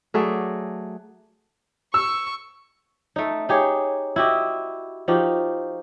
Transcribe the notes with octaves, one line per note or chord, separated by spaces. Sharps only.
F#3 A3 G#4 D5
C#6 E6
A3 D#4
D#4 G4 G#4 C#5
E4 F#4 G4 D#5
F3 D#4 F#4 G4